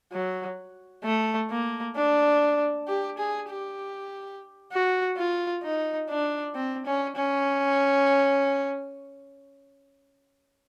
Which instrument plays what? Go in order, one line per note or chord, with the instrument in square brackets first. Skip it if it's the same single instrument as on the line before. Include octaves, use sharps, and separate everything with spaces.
[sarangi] F#3
A3
A#3
D4
G4
G#4
G4
F#4
F4
D#4
D4
C4
C#4
C#4